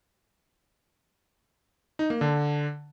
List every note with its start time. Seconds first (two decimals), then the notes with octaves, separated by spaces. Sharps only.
1.99 D#4
2.10 A#3
2.21 D3